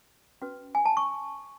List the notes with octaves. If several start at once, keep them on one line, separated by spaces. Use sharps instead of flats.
C#4 F#4 B4
G#5
A5
C#6